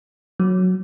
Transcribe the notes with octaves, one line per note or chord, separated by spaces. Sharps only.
F#3